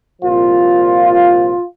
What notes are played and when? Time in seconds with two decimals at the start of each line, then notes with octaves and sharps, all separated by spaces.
0.22 C2 A#2 F3 F4